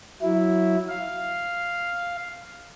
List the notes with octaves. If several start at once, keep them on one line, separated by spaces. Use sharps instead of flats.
F#3 E4
F5